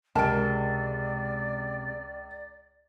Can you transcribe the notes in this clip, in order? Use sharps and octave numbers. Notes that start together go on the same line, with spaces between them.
C#2 C3 G#3 A#4 D5 A5 D7